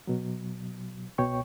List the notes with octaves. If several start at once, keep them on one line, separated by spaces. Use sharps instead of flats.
B2 F#3
C2 B2 C#5 G5 C#6